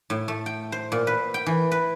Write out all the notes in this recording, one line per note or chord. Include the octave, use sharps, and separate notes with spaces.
A2
A3
G5
C5
A#2
B4
G5
E3
B4